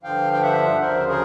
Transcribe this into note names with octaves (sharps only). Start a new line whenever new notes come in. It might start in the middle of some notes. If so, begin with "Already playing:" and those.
G2 D3 F3 F5 G5
G5
E5 F#5
D2 C#3 F3 A#4 C5
G#4 A#4